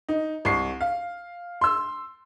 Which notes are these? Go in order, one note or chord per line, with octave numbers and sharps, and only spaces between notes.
D#4
C2 C#6 C7
F5
C6 E6